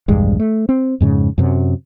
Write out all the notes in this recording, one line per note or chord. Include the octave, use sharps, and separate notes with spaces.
A#1 E2 G2 G#3
A3
C4
F2 G#2 C#3
F#2 C3 F#3